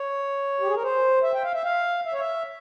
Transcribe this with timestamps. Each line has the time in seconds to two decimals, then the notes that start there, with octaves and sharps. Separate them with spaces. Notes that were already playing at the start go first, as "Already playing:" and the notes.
Already playing: C#5
0.60 G4
0.67 G#4
0.75 A#4
0.82 C5
1.23 E5
1.33 G5
1.43 F5
1.53 E5
1.64 F5
2.05 E5
2.13 C#5
2.20 E5